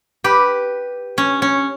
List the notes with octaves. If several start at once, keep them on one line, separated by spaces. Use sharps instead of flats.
G4 B4
C#4
C#4